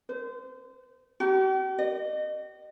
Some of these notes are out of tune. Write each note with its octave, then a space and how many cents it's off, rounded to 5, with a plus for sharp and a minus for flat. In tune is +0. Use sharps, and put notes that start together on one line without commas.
C5 -30
G4 -45
D#5 -30